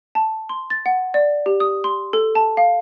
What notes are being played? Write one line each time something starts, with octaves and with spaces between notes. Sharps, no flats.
A5
C6
A6
F#5
D5
G4
D#6
C6
A4
A5
F5